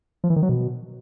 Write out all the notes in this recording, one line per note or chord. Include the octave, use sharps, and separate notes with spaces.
F3
E3
D#3
F#3
B2